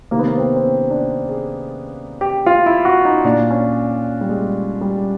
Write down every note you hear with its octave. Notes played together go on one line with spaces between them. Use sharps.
C3 D#3 A#3
B3
A#3
C4
C4
C#4
D4
G#4
G4
F4
E4
F#4
D#4
A#2 D4
C#4
G3
G#3
G3